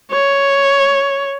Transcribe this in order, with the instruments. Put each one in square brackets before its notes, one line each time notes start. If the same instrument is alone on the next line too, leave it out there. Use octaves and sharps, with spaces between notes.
[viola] C#5